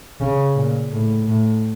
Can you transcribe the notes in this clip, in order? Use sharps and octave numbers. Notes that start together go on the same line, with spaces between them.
C#3
A#2
A2
A2